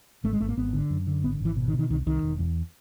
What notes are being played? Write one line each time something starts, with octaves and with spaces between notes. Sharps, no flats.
G#1 A3
G#3
G#1 A3
A#3
G#1 B3
D3
F#2
D3
G#1 B3
G#1 E3
B2
D#3
B2
D#3
C2 D#3
C2 D#3
E1
E2